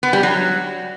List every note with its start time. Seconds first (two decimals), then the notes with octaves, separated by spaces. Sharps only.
0.03 B3
0.13 G3
0.23 F#3